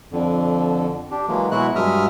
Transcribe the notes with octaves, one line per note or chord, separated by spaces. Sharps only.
F2 D3
D4 G4
E3 F#3 G#3 A#3
B2 F#3 G#3 E4 F#4 F#6
G2 F#3 G#3 E5 D#6 F6